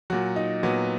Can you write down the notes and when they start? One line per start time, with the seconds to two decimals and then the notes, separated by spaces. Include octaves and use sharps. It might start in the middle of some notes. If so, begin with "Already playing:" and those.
0.10 A#2 F#3 F#4
0.36 D#4
0.63 A#2 F#3 B3